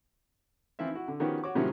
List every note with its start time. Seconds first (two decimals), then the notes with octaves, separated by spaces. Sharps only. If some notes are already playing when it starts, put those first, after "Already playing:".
0.79 E3 F3 C4 E4 F4 E5
0.91 E4 F#4
1.08 D3
1.20 D#3 F3 B3 C#4 F#4 G4
1.44 F#4 C#5 D6
1.55 A2 C3 D#3 F3 F#3 C#4